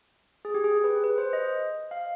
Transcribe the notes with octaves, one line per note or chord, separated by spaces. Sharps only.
G#4
G4
G#4
G#4
B4
B4
C5
D#5
F5